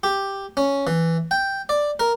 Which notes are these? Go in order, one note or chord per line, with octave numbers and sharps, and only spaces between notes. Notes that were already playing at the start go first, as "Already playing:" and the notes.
G4
C#4
E3
G5
D5
A#4